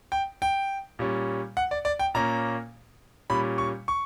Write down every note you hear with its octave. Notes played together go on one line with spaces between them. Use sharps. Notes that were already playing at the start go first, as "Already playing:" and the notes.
G5
G5
A#2 G3 C#4
F#5
D5
D5
G5
A#2 A#3 C#4 A#5
A#2 G3 C#4 B5
C#6
C#6